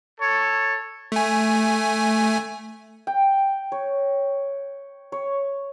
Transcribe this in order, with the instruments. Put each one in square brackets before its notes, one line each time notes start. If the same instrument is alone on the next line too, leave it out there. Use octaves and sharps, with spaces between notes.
[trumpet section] A4 C#5
[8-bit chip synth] A3 G#5
[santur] G5
C#5
C#5